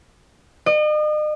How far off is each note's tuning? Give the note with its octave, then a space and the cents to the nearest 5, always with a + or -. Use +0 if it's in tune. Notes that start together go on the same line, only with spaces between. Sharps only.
D#5 -40